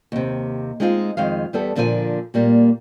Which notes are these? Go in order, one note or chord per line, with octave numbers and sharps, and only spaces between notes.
D#2 C3
G#3 C4 D#4 F4 G#4
F2 D#3 G#3 F5
E2 G3 B3 A4
A#2 D3 F3 A#4 D#5 G#5
A#2 G3 A#3